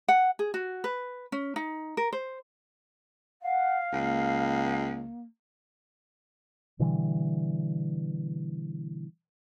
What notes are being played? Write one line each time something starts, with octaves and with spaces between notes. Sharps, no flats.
F#5
G#4
F#4
B4
C#4
D#4
A#4
C5
F5 F#5
C#2 A#3
B2 D3 E3 G3